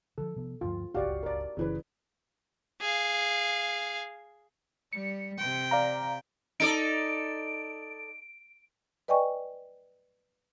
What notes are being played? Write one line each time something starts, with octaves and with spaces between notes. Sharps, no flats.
D3 E3 F3 A4
C3 F3 B3
D2 G2 F3 F4
D1 G1 C#2 F#4 G4 D5 F5
A#4 D5
F#1 C#3 E3 B4
G#4 F5
G3 C#7
C3 G5
D5 F5 A#5
D#4 A4 D5 D7
B4 D5 D#5 G5 G#5 C#6